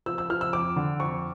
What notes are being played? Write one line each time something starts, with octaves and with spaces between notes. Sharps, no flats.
F3 E6
E6
F3 F6
E6
F2 D6
D3
F2 C#6